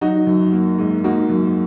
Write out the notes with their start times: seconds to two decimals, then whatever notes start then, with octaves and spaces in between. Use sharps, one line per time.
0.01 F#3 D#4 F#4
0.27 F#2
0.53 A#3
0.78 G#2
1.04 A#3 D#4 F#4
1.29 F#2